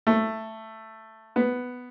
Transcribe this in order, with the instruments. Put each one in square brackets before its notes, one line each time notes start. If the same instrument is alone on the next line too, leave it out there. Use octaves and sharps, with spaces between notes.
[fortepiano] A3
B3